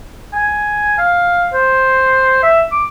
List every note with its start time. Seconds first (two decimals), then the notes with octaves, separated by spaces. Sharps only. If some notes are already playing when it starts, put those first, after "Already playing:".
0.33 G#5
0.98 F5
1.53 C5
2.43 E5
2.72 D6